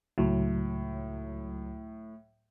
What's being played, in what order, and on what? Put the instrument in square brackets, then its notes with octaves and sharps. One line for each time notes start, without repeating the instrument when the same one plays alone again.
[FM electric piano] C#2 F#3 [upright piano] A2